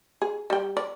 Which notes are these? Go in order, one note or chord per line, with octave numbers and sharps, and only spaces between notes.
G#4
G3 G5
D5